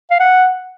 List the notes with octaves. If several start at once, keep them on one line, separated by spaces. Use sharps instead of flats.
F5
F#5